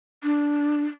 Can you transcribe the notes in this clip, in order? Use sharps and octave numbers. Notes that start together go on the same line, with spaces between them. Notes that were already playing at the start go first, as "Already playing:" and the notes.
D4